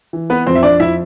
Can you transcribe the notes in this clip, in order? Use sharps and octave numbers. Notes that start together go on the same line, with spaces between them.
E3
B3 B4
F2 C4 C5
E5
D4 D5
F2 E4 E5